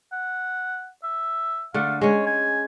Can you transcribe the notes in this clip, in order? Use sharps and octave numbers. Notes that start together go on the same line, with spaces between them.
F#5
E5
D3 A3 F5
G#3 C#4 C#5
G#5